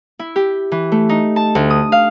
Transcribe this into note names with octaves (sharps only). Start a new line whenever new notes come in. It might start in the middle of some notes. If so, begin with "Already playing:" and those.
E4
G4
E3
A3
D#4
A5
D2
D#6
F5